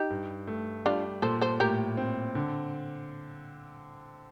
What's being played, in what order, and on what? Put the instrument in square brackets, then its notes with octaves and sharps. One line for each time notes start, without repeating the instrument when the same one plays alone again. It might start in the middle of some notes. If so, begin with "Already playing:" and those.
Already playing: [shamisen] D#4 G4
[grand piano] G2
A3
[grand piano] G3 [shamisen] D4 F4
[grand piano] A#2 [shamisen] A4 C5
[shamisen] A4 C5
[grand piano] A2 [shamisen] G4 A#4
[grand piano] C4
D3